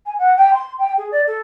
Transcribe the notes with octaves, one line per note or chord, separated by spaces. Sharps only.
G#5
F#5
G5
C6
G5
G#4
D5
A4